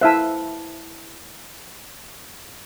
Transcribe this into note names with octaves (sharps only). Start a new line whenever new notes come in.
E4 C5 E5 F5 A5